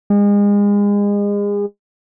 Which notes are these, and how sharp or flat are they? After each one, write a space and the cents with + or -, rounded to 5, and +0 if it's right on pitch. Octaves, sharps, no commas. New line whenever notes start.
G#3 -35